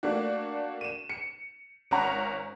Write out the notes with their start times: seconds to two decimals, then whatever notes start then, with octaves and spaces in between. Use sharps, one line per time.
0.03 A3 A#3 D4 F#4
0.81 D#7 E7
1.10 C#7
1.91 G#1 C#4 F#5 A#5 C#6